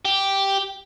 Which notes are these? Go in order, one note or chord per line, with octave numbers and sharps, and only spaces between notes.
G4